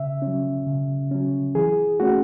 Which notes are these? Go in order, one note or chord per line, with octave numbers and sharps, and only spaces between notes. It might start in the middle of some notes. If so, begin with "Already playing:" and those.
Already playing: C#3 E5
C#4
F#3
C#3
F#3 C#4
E3 G#4
A3 C#4 F#4